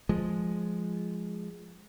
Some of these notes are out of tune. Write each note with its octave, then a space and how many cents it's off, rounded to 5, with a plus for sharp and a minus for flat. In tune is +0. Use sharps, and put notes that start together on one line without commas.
F3 +0 G#3 +0